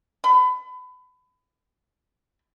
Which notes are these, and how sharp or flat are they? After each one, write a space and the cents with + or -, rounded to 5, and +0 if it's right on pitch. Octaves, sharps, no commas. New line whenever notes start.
B5 +30